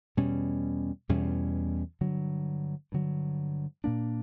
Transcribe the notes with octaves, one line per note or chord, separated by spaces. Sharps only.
E2 B2 G3 C#4
E2 B2 G3 C#4
G2 D3 F#3
G2 D3 F#3
A#2 A#3 D4